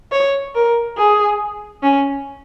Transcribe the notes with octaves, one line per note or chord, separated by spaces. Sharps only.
C#5
A#4
G#4
C#4